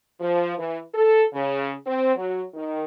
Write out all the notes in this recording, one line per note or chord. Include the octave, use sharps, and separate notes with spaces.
F3
E3
A4
C#3
C4
F#3
D#3